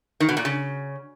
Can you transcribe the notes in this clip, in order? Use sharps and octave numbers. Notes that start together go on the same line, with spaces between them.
D#3
B2
A#2
C#3